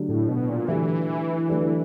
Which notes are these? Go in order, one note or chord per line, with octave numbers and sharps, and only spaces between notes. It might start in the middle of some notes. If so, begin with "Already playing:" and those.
Already playing: D3 F#3 A3 D4 G4
A2
B2
A#2
D3 E3 F#3 A3 D4 G4
D3 F#3 A3 D4 G4